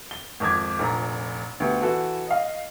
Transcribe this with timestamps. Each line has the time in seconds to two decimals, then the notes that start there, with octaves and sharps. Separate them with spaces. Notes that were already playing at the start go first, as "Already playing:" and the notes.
0.11 G7
0.40 G#1 F2 D6 G#6
0.79 F1 A#1 A#5
1.60 D2 B3 G4
1.82 E3 F#4 A4
2.27 D#5 F5